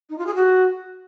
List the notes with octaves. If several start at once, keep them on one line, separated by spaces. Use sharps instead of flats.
D#4
F4
G#4
F#4